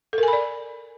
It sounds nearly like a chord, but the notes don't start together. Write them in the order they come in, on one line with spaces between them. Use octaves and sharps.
A4 A#4 G#5 B5 D5